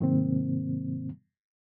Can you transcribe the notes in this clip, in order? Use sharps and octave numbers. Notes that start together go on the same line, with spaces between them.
G#2 C3 D#3 F#3 A#3 C4